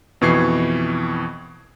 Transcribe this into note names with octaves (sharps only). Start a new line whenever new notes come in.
F2 B2 E3 C#6 G#6 C7